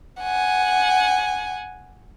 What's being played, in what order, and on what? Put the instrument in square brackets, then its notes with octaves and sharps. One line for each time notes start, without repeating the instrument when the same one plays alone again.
[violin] F#5 G#5